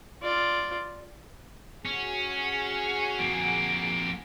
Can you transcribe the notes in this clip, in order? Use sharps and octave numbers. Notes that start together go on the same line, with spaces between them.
F4 D5
C#4 F#4 G#4
F2 A#3 D7